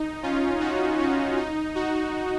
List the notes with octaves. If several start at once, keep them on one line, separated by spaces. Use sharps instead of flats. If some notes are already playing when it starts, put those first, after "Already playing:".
Already playing: D#4
C#4 F4
D#4 F#4
C#4
D#4
D#4 F#4